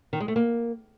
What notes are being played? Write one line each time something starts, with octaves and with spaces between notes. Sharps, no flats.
D#3
G#3
A3
A#3